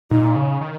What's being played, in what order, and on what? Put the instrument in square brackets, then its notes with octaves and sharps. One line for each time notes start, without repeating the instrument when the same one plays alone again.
[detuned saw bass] A#2 [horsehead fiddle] D#4
[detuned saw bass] C#3
D#3